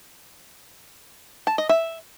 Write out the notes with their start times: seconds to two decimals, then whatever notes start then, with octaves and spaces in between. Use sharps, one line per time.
1.47 A5
1.58 D#5
1.69 E5